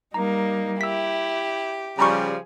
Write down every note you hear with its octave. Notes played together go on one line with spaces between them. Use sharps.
G3 A#3 D#4 A#5
E4 G4 E6 B6
C#3 F3 G3 G#4 A#5 B5 C#6